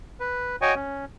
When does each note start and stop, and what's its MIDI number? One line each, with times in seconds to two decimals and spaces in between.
0.20 0.56 71
0.62 0.75 66
0.62 0.75 73
0.62 0.75 75
0.62 0.75 79
0.62 0.75 80
0.62 0.75 85
0.75 1.05 61